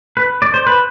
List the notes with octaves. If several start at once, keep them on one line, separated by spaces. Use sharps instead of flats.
B4
D5
C5
B4